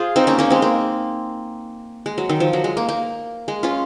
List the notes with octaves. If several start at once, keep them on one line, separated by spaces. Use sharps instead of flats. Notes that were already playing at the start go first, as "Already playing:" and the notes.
Already playing: F4 G#4 C5
C4 D#4
A#3 C#4
A#3 C#4
G#3 C4
A#3
G#3
F#3
D#3
F3
F#3
G#3
A#3
A#3
G#3
C#4 F4